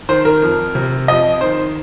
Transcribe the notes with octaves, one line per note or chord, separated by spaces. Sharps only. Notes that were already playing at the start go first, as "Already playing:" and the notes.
D#3 C5
A#4
F2
C3
F2 D#5
D#3 C5